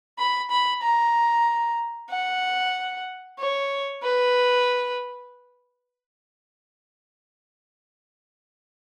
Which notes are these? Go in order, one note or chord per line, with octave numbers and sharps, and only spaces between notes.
B5
B5
A#5
F#5
C#5
B4